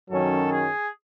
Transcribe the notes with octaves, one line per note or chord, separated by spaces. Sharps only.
F#2 D#3 F#3 C#4 A4
G#4